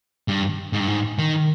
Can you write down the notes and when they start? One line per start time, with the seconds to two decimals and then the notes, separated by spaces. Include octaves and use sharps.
0.28 G2
0.73 G#2
0.80 G2
0.88 G#2
1.19 D#3